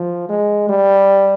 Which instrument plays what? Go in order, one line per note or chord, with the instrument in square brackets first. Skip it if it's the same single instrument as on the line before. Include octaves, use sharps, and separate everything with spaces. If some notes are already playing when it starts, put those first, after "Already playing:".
Already playing: [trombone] F3
G#3
G3